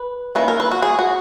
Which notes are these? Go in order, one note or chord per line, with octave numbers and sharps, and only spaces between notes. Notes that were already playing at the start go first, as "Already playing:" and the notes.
Already playing: B4
D#3 A#3 C#4 E4 B4
A#4
B4
F#4
G#4
F#4